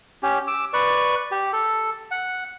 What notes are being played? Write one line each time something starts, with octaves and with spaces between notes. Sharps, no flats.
C#4 G4
D6 E6
B4 D5 C#6
G4
A4
F#5